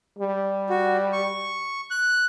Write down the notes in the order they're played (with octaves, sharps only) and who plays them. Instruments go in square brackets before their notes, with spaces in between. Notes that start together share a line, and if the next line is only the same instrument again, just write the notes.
[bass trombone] G3
[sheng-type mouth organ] F#4
C#6
F#6